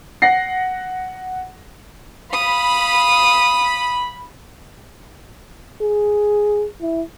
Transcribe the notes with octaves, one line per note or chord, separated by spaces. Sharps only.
F#5 A#6 C7
F5 B5 D#6
G#4
E4